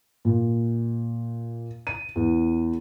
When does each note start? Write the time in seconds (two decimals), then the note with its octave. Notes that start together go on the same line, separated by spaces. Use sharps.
0.25 A#2
1.87 D#7
2.16 E2